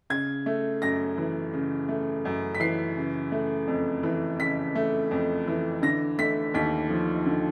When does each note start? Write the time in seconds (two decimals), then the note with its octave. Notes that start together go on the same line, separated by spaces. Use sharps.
0.10 C#3 G#6
0.46 A3
0.82 F#2 A#6
1.18 E3
1.53 C#3
1.89 A3
2.25 F#2
2.55 B6
2.60 E3 C7
2.97 C#3
3.32 A3
3.68 F2
4.03 E3
4.39 C#3 B6
4.75 A3
5.11 F2
5.48 E3
5.82 D3 A#6
6.18 A3 B6
6.54 D#2 B6
6.90 F3
7.26 D3